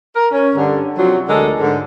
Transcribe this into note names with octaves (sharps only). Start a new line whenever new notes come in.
A#4
C#4
G2 D3
C3 F3 F#3
D2 D3 G#3 A4 A#4
G#2 D3